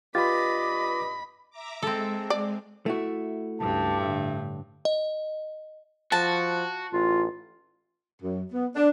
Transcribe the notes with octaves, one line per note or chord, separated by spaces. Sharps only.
G2 F4 G4 B4 D#5 B5 D6 A6
E5 A#5 D6
G#3 C4 A4
D5
A3 E4 F#4
C#2 G2 A5
A2 D3 E5
D#5
F3 F#4 A5
A1 F4
F#2
B3
D4